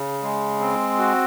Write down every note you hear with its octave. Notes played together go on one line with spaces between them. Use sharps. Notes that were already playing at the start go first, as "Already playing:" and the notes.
Already playing: C#3
G#3
C4
F#4